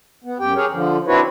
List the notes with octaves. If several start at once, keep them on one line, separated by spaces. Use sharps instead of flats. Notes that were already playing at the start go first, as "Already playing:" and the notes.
B3
F#2 G4 G5
G4 G#4 A#4 C#5
D3 F3
C4 D4 E4 F#4 B4 C#5